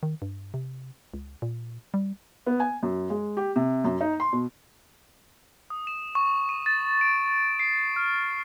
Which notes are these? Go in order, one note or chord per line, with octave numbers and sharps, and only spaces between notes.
D#3
G2
C3
C#2
A#2
G3
B3
G#5
F#2
G#3
G4
C3
F#2
D#4
C6
B2
D#6
E7
C#6
D#7
A6
D7
C7
F6